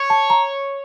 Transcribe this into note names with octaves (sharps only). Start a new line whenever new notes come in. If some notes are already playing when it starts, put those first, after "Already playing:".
Already playing: C#5
A5
A#5